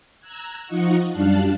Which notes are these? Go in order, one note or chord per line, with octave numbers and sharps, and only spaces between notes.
A#5 E6 F#6 G#6
F3 D#4 F4 D#5 F#5 C#6
F#2 G3 D4 F5 A5 F#6